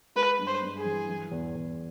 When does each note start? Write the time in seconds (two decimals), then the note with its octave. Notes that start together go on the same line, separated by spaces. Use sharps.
0.16 G#3 B4
0.39 G2
0.47 C5
0.63 G2
0.78 G#4
0.85 E3
1.08 E3
1.31 E2
1.55 E2